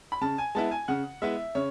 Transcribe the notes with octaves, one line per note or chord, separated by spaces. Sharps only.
B5
C#3 A5
G#5
G#3 B3 E4 A5
G#5
C#3 F#5
G#3 B3 E4 E5
C#3 C#5